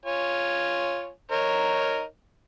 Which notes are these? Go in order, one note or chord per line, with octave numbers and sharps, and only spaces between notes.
F4 C#5 G#5
D#4 A#4 C#5